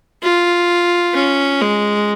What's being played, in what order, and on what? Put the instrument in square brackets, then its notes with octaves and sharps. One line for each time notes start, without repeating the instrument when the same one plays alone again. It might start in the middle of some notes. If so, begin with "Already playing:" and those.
[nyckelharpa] F4
C#4
G#3